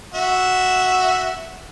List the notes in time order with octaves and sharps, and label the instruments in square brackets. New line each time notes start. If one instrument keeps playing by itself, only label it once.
[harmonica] F#4 E5